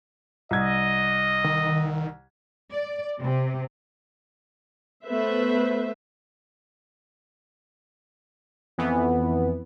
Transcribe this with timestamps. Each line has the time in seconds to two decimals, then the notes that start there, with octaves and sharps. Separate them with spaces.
0.51 C2 D#5 G#6
1.45 D#3
2.72 D5
3.22 C3
5.06 A3 B3 B4 C5 E5
8.78 F2 E3 B3